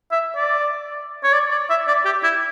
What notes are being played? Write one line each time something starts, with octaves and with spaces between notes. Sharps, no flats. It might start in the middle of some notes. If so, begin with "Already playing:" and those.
E5
D5
C#5
D5
D5
E5
D5
G4
E4